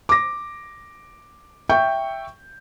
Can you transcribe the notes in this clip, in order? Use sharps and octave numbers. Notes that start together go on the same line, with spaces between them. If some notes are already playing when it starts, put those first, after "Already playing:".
D6 A#6
E5 G5 C#6 G6